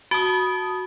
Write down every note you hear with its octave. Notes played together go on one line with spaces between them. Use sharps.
F#4 A5 D#6